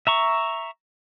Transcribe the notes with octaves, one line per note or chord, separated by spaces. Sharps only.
E5 A#5 C#6